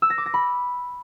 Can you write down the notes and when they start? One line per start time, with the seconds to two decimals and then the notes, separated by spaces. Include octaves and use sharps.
0.02 E6
0.10 A#6
0.18 D6
0.26 A#6
0.34 B5